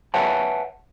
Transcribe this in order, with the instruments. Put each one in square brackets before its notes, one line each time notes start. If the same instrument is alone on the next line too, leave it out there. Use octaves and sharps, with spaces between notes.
[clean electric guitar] B4 C#5 E5 F#5 G#5 A5